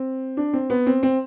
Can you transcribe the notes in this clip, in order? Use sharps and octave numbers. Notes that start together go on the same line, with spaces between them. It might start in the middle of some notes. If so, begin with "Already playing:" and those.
Already playing: C4
D4
C4
B3
C4
C4